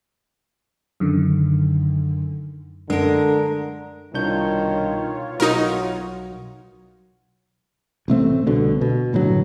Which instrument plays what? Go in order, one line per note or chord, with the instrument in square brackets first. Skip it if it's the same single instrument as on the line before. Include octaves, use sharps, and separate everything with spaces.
[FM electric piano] F#2 D3 D#3
[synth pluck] F#2 [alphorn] D3 [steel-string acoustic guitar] G#3 A#4
[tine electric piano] C2 D4 G6 [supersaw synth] B2 F4 C#5 [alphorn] D#3
[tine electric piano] B1 [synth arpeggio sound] D#4 A#4 [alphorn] F#4
[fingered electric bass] A1 C3 A3 C4
C2 B2 D3
B2
F#1 A2 D3 F#3